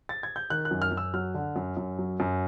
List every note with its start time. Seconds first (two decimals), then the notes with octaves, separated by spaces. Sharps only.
0.09 A6
0.23 G#6
0.36 G6
0.50 D#3 F#6
0.65 F#6
0.71 F#2
0.82 F6
0.92 F#2
0.97 E6
1.14 F#3 F6
1.34 D3
1.56 F#2
1.77 F#2
1.99 F#3
2.20 F#2